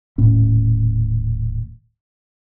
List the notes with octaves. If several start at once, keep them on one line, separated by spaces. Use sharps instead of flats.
D#1 A2 C#4